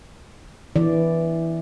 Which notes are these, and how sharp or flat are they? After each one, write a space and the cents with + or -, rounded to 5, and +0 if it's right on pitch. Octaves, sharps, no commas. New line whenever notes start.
E3 -5 D5 +0